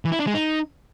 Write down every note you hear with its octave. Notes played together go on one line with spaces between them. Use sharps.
E3
E4
D4
G#3
D#4